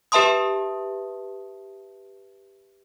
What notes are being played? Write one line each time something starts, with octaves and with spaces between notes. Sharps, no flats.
G4 B4 E5 A5 C6 D#6